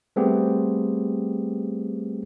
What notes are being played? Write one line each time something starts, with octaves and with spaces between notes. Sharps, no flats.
G3 A3 B3 C4 G4 G#4